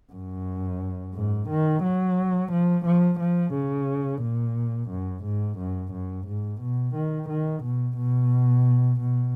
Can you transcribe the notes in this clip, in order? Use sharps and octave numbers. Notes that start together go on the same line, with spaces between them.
F#2
G#2
D#3
F#3
F3
F3
F3
C#3
A#2
F#2
G#2
F#2
F#2
G#2
B2
D#3
D#3
B2
B2
B2